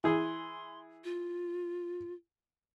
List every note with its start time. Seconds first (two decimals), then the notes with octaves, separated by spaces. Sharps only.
0.04 E3 G#4 C6
1.04 F4